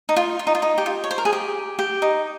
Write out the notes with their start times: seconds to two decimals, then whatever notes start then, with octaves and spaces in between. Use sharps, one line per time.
0.09 D#4
0.16 F4
0.39 F4
0.47 D#4
0.55 F4
0.62 D#4
0.78 G4
0.86 F4
1.04 C#5
1.11 C5
1.18 A#4
1.25 G#4
1.33 G4
1.79 G4
2.02 D#4